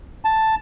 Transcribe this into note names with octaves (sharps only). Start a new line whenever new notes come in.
A5